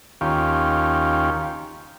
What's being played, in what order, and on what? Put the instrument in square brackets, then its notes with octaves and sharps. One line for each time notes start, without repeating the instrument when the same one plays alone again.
[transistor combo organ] D#2 C#4 F4 G4